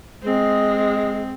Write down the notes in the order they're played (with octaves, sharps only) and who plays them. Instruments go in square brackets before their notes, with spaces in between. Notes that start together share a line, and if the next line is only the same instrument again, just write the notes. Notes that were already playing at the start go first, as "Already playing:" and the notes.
[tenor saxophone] G#3 [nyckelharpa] C4